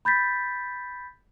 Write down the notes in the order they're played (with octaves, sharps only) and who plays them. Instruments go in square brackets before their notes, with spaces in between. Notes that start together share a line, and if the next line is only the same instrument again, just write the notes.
[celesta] B5 G6 A6 B6